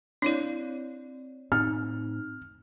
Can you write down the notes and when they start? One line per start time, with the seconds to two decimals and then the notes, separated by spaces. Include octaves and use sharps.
0.22 C4 D4 E4 C#5 D5
1.52 A2 C4 D#4 F6